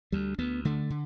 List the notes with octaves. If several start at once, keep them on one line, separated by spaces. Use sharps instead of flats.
D2 G3
D2 B3
D3 A3
D3